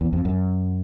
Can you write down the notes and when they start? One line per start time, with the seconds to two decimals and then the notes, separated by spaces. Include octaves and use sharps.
0.01 E2
0.13 F2
0.25 F#2